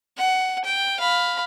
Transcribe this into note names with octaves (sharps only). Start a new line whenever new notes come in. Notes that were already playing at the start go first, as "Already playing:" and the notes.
F#5
G5
F5 B5